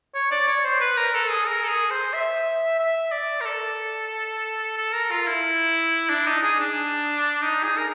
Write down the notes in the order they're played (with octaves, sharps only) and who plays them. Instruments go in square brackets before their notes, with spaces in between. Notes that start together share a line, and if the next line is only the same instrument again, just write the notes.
[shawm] C#5
D5
C#5
C5
B4
A#4
A4
G#4
A#4
A4
G#4
C5
E5
E5
D5
A#4
A4
A4
A#4
F4
E4
D4
D#4
G#4
D4
D#4
G#4
A#4